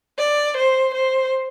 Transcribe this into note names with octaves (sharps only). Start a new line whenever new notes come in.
D5
C5
C5